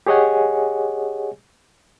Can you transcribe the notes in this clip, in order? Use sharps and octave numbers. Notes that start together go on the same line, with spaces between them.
G4 G#4 C#5 D#5 F#5 G#5